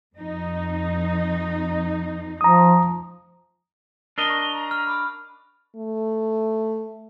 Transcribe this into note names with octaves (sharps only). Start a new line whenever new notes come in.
F2 D#4
F3 A#5 D#6
D4 A#4 D#5 G7
C#6
A#5
F6
B5 D6
A3